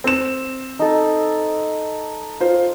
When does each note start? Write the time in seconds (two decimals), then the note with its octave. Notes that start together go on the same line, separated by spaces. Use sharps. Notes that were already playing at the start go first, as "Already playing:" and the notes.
0.04 C4 E7
0.79 D#4 A4
2.40 F4 C5